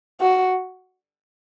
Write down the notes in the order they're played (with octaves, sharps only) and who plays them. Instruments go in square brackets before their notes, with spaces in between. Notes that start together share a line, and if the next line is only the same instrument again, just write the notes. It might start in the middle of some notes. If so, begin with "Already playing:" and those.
[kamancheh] F#4